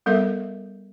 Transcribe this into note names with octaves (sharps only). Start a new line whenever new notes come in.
G3 B3 A4 A#4 D#5 E5